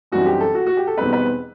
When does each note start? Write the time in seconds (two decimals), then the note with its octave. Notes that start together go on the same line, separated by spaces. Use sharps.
0.12 F#2 E3 G3 C4 D#4 F#4
0.26 G4
0.40 A4
0.55 F#4
0.66 F#4
0.77 G4
0.87 A4
0.98 E2 B2 G3 C4 D#4 B4
1.13 B4